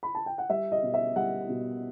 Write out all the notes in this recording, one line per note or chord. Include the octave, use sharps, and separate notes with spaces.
B5
A5
G5
F#5
G3 E5
D#5
B2
E5
G3 F#5
B2